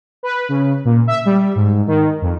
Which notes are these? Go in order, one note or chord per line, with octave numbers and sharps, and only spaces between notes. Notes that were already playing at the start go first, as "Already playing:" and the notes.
B4
C#3
A#2
E5
G3
G#2
D#3
F2